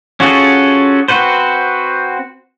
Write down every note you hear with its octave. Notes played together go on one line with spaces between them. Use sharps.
C#4 F4 F#4 G#4 A4
C4 F#4 B4 C5